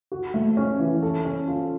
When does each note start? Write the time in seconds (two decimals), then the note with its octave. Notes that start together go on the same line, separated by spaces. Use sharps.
0.12 F#4
0.34 A3
0.57 C#4
0.79 E3
1.02 A4
1.25 C#4
1.48 F4